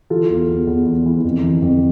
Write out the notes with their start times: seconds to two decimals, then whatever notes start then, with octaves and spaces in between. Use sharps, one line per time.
0.10 E3 F4 A4
0.29 E2
0.48 E2
0.67 E2
0.86 E2
1.06 E3
1.24 F2
1.44 E3
1.62 F2